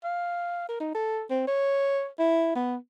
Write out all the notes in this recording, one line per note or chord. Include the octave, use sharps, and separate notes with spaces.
F5
A#4
D#4
A4
C4
C#5
E4
B3